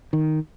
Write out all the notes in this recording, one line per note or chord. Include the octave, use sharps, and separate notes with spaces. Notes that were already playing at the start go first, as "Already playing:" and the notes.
D#3